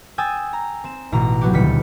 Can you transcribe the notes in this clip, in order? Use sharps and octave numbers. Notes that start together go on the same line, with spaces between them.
G5 G#5 D#6 E6 A6
A#5
C4 E7
A1 B2 A#5
F#3 B3 F#4 G4
D#1 D2 G3 B3 B6 C#7